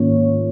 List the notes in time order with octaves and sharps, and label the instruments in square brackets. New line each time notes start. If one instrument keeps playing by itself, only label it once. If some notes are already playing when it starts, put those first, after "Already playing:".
Already playing: [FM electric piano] G#2 D#3 A#3 C#4 F4 C#5